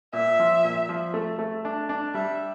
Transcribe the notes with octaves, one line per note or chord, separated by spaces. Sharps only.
A#2 E5
F3
A#2
F3
A3
A3
D4
D4
G3 E5